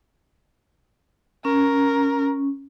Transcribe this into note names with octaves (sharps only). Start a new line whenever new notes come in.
C#4 A#4